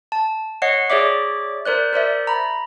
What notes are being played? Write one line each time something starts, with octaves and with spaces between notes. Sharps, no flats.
A5
C#5 D#5 F#5 C7
G#4 C#5 D5 E5 D6
A#4 C5 D5 F#6
A#4 C5 D5 E5
A#5 B5